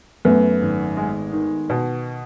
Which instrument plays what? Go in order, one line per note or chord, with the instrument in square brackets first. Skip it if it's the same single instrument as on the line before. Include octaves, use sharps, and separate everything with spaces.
[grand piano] F#2 [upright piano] A3 B3
[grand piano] G#1
G#3
D#3
B2